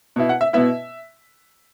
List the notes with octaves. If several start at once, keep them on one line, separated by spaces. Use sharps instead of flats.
B2 B3 E4
F#5
E5
B2 B3 E4 E5